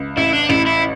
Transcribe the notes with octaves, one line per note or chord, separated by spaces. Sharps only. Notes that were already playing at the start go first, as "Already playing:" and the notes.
Already playing: C#2
A1 E4
D4
A1 E4
E4